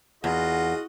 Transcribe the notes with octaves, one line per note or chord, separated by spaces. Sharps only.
E2 F4 F#4 G#4 D#5 F#5